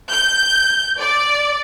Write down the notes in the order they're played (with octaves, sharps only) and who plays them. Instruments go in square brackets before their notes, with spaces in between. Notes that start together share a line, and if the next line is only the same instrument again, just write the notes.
[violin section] G6
D5